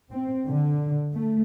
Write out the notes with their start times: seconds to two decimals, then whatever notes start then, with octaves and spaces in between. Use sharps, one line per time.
0.11 C4
0.46 D3
1.13 A3